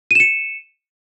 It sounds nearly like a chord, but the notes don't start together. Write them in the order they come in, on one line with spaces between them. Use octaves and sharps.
D#7 E7 C#7